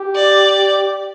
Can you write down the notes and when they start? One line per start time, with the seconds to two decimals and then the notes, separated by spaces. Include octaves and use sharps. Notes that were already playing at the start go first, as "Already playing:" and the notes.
Already playing: G4
0.15 D5